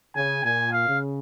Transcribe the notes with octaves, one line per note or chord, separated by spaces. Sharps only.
C#3 G#5
A#2 G#5
F5
C#3